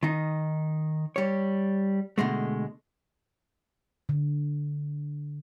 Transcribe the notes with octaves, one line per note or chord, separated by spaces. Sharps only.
D#3 D#4
G3 C#5
B2 D3 G#3 A3
D3